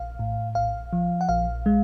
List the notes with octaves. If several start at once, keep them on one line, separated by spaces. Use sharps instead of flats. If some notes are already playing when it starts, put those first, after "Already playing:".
Already playing: A#1 F5
A2
A#1 F5
F3
F#5
A#1 F5
G#3